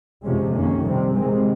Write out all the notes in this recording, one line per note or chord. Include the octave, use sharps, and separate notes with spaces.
F2 C3 F3 G#3 C#4
F2 D#3 A#3 C#4
C3 G3 C4
C3 D#3 G#3 C4